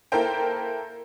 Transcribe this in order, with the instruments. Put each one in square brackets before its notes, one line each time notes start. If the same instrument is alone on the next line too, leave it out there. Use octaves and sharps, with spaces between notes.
[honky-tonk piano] A#3 E4 A4 A#4 C5 G5